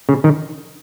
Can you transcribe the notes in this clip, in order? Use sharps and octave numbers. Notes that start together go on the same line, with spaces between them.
C#3
D#3